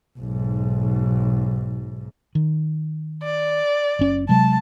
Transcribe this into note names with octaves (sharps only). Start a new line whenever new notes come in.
B1 G#2
D#3
D5
F#1 C#4
C3 F#3 G#3 A5